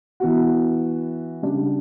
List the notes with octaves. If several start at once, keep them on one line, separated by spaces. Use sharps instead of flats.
E3 B3 F#4
C#3 G3 D4 G4 D5